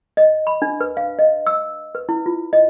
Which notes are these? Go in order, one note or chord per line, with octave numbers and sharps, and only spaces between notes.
D#5
B5
D4
B4
F5
D#5
E6
B4
E4
F4
D#5